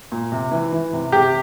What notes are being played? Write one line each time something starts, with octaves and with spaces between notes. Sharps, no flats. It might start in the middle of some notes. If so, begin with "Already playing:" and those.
A#2
C3
E3
E3
C3
C3 G4